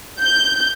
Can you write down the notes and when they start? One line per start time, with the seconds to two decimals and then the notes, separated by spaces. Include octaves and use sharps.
0.20 G6